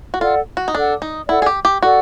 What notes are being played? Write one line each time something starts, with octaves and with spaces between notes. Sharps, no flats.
F#4
F4 A4 D5 F#5
F#4
D#4
D4 A4 D5 F#5
D#4
E4 A4 D5 F#5
G#4
G4
G4
F#4 A4 D5 F#5